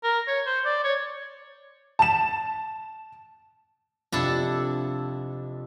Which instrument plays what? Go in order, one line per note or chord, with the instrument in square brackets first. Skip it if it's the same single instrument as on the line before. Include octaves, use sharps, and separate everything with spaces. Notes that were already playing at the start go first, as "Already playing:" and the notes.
[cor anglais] A#4
C#5
C5
D5
C#5
[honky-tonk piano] A5 E7
[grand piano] F2 C3 [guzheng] D4 E4 A4